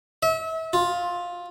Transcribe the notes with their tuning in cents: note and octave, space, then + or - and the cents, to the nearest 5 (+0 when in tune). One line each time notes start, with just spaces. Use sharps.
E5 -35
F4 +10